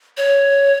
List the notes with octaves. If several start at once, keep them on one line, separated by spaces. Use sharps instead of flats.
C#5